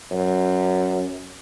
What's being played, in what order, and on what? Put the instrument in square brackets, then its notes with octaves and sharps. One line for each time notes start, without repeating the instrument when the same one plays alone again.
[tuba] F#2